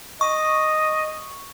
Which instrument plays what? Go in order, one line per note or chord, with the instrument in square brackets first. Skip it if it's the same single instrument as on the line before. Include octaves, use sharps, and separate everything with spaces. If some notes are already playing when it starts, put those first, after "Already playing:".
[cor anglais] D#5 [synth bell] C#6